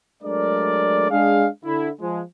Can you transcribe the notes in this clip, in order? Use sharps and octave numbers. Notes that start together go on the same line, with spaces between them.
F#3 G#3 A3 D4 A#4 D5
G#3 D4 G#4 F5
D3 E4
F3 G#3